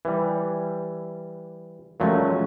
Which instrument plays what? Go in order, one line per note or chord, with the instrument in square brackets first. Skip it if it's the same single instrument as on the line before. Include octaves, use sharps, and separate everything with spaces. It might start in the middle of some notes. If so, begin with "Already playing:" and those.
[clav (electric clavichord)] E3 G3
[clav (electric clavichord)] A#2 F#3 A3 [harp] F3 G#3 C#4